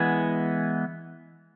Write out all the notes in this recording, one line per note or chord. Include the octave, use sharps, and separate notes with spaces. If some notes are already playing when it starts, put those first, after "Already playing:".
Already playing: E3 G#3 B3 F#5 G#5